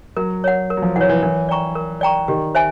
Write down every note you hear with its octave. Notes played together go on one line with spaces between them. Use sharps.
F#3 A#4
C#5 F#5
A#4
F#3
F3
E3 C#5 F#5
E3
E3 A#4
D5 G5 A#5 C#6
A#4
D5 G5 A#5 C#6
D#3 G4
C5 E5 G#5